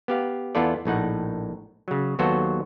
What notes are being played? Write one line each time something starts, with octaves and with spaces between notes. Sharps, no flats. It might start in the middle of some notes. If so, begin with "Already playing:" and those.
B3 G4 F5
E2 B3 E4 F4 A4 D5
A#1 A2 D#4 F#5
C#3 F#3
D#2 F#3 B3 F#4 A4 C5